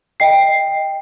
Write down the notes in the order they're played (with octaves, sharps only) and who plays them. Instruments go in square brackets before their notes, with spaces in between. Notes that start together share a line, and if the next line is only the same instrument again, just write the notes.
[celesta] D#5 G5 C7